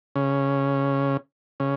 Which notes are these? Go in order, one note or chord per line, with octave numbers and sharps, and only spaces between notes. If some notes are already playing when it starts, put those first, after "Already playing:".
C#3
C#3